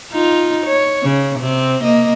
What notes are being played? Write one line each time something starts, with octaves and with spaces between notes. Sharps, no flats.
D#4 F4
C#5
C#3
C3 C4
A#3 D#5